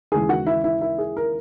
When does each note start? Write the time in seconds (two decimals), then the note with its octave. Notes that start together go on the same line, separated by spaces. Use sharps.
0.12 D#2 C#3 E3 G#3 G#4 G#5
0.29 F#4 F#5
0.47 E4 E5
0.64 E4 E5
0.81 E4 E5
0.99 G#4
1.17 A#4